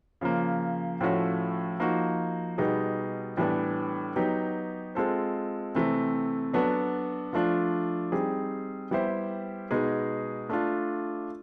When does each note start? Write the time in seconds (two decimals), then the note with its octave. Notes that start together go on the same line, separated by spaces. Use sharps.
0.21 C#3 F3 A#3
1.01 A2 F3 A3 C#4 F#4
1.80 F3 A#3 D#4 F#4
2.58 B2 G3 B3 D#4 G#4
3.37 A2 E3 G3 B3 D4
4.16 F#3 B3 D#4 G4
4.95 G#3 C4 F4 A4 C5
5.75 C3 E3 A3 C4
6.53 F#3 B3 D4 F#4 A4
7.33 F3 A3 D4 F4
8.12 G3 C4 D#4 G#4
8.91 G3 B3 E4 G4 C5
9.71 B2 G#3 B3 D#4 G#4
10.49 A3 D4 F4